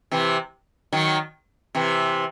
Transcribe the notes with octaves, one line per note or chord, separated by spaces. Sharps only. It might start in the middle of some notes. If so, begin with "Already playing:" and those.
C3 E3
D#3 F#3
C3 E3